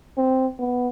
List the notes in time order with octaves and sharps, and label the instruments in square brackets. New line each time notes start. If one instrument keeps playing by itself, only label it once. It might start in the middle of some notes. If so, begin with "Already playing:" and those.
[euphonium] C4
B3